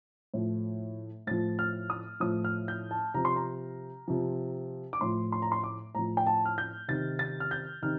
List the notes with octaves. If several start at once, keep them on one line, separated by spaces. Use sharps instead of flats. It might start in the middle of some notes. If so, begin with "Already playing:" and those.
A2 F3
A2 F3 A6
F6
D#6
A2 F3 D#6
F6
G6
A5
C3 F3 A#5
C6
A#5
C3 F3
D6
A2 F3 C6
C6
A#5
C6
D6
A2 F3 A#5
G5
A5
F6
G6
C3 D#3 A6
A6
F6
G6
C3 D#3 F6